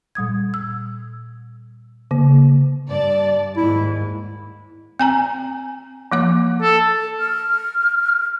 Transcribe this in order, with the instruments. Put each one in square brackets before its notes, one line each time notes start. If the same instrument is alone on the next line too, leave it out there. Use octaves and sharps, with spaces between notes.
[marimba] A#2 G3 D#6 G#6
E6
C#3 A#3
[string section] G2 D5 A5
[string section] D#2 G#2 [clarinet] E4
[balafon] C4 G#5 A#5
F3 A#3 D6
[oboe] A4
[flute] F6